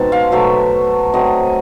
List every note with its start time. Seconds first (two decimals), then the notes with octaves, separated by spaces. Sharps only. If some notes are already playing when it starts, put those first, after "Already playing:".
Already playing: B2 G#3 C4 D#4 A5
0.12 F5
0.32 B2 F#3 A3 E5
1.14 F#3 A3 C4 D#5